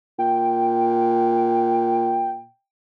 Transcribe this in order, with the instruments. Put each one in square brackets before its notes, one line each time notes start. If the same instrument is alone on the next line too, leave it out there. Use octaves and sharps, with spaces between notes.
[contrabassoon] A#2 [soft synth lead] G5